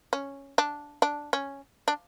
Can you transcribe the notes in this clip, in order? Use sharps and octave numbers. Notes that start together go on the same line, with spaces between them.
C#4
D4
D4
C#4
D4